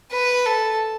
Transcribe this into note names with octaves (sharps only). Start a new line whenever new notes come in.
B4
A4